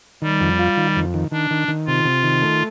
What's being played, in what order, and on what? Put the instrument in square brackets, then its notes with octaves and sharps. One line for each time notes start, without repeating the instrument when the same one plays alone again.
[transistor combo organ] D#3 [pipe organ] G3
[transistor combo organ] F2
F4
D#3
F2
D#3
[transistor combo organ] D#3 [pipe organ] D4
[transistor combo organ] D#3
D#3
[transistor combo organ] C3 [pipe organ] F4
[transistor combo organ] C3
D#3
A3